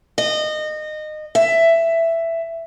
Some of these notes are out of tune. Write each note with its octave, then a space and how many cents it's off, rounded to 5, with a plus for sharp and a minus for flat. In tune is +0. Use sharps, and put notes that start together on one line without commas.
D#5 -25
E5 +10